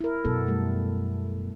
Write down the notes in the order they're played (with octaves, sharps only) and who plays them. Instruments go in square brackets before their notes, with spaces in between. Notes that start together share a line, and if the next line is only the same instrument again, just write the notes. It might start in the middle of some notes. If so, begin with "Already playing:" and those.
[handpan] E4 A#4
[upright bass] F#2 B2 [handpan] B3 A4
[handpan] G3 A3